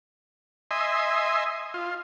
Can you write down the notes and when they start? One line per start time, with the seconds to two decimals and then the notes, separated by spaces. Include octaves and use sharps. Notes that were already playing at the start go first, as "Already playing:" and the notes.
0.71 D#5 E5 G#5 C6
1.74 F4